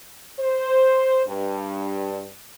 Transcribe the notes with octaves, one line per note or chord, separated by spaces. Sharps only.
C5
G2